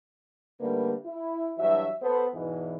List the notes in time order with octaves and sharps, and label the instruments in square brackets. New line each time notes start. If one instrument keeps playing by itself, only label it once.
[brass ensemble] G#2 D3 G3 A3 A#3 B4
E4
G2 E3 F#3 F#4 E5
B3 A4 C5
E2 G#2 B2 E3